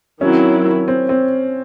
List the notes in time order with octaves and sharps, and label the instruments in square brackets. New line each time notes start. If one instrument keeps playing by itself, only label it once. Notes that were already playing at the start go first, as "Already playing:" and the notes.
[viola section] D#3 F#3 C4 E4 [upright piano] C#4
[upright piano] C4
C4